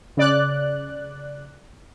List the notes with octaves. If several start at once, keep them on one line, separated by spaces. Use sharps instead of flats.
C#3 D5 F#6